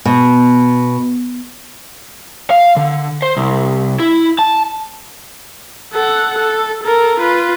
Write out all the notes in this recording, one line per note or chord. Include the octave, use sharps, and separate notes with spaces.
B2
F5
D3
C5
C2
E4
A5
A4 F#5
A4
A4 A#4
F4 B4